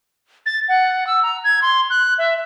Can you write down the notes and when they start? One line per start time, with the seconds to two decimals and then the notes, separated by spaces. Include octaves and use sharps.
0.46 A6
0.68 F#5
1.07 E6
1.23 A#5
1.44 G#6
1.62 C6
1.90 F#6
2.18 E5